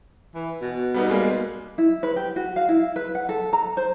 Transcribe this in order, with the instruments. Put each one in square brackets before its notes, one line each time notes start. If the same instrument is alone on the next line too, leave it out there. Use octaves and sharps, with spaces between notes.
[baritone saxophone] E3
B2
[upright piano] G3 B3 D#4
G3 G#3 A#3
[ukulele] E4
B4
G4
F#4
F5
E4
B4
F#5
A4
A#5
C5